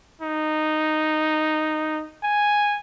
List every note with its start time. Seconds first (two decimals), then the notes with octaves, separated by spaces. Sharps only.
0.21 D#4
2.23 G#5